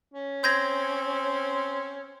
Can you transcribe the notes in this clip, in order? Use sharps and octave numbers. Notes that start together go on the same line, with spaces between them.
C#4
C4 G6 G#6 A#6